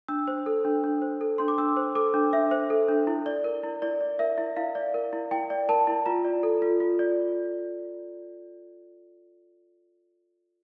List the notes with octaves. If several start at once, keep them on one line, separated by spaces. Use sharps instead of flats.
D4 E6
C5
A4
D4
D4
C5
A4
D4 C6
D6
D4 E6
C5
A4 D6
D4
D4 E5
C5
A4
D4
E4
D5
A#4
E4
E4 D5
D5
A#4 E5
E4
E4 F5
D5
A#4
E4
E4 G5
D5
A#4 A5
E4
F4 A#5
D5
A4
F4
F4
D5